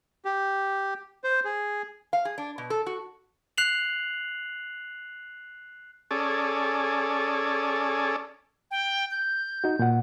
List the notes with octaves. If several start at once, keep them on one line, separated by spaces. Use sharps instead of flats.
G4
C5
G#4
F5
G#4
D4
B2
A4
F#4
F#6 C7 F7 F#7
C#4 G#4 A4 D5
G5
G6
D#4 F#4
A#2 F#5